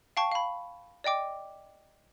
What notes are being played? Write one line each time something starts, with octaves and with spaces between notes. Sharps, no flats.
F5 G5 A5 C#6
F5 B5
D5 D#5 G5 D6